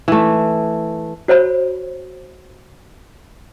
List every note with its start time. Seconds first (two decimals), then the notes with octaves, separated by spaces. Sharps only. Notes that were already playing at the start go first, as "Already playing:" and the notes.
0.08 E3 A3
1.28 F#4 C5 C#5 B5